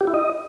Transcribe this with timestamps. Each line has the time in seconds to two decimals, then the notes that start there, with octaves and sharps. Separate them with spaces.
0.01 G4
0.07 E4
0.14 D#5